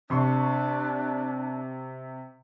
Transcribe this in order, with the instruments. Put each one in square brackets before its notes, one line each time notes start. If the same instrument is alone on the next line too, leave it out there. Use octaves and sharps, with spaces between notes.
[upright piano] C3 C6 C#6 [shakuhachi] D4